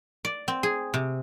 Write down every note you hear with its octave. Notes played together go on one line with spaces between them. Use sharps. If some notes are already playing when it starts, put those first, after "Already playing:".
D5
C4
G#4
C3